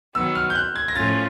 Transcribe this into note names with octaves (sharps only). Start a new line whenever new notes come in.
D#3 F#3 B3 E6
F6
G6
F#6
G#6
A#6
A2 F3 A3 C#4 F4 A6